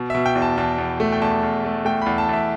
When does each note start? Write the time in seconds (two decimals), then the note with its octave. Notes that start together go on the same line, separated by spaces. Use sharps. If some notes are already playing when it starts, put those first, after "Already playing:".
Already playing: B2
0.10 E5
0.15 B2
0.26 G5
0.35 E2
0.42 A5
0.57 E2 A5
0.78 E2
1.00 A3
1.12 G5
1.22 E2 A5
1.43 E2
1.65 A3
1.85 A3 G5
2.02 B5
2.06 E2
2.18 A5
2.29 E2 E5